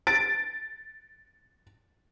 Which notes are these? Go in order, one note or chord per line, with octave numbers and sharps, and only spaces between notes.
A6 D7